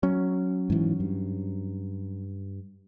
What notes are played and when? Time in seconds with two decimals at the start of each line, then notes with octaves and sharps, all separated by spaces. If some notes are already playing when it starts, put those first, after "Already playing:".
0.03 F#3 C#4
0.70 G#2 E3
1.00 G2